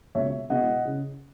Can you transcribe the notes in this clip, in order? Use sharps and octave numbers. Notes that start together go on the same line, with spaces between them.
C#2 B2 A#3 C#5 E5
B2 G#3 B3 E4 D#5 F#5
C#3